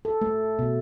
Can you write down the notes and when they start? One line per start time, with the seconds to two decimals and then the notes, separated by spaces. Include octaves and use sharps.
0.05 A4
0.21 A3
0.59 B2